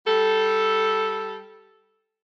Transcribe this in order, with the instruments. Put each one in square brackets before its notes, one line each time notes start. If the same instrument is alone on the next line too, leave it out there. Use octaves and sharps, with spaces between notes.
[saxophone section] G3 A4